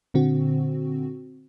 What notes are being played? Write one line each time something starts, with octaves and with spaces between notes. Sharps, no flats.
A#2 D3 C4 F#4